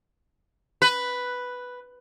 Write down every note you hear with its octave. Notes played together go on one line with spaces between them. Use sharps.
B4